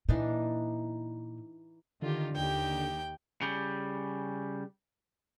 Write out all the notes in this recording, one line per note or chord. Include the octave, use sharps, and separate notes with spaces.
A#2 E3 D4 D#4
D3 D#3 F4 G4
D#2 D#4 G4 G5
C#3 G3